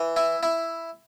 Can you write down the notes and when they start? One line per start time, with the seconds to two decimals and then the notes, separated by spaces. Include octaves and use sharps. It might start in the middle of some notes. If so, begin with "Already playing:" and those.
Already playing: E3
0.16 E4
0.43 E4